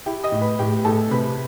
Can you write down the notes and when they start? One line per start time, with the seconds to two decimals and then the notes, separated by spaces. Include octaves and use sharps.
0.06 E4 G4 G5
0.24 D#5 D#6
0.32 A2
0.41 B4 B5
0.59 A2 G4 G5
0.85 A2 A4 A5
1.11 C3 B4 B5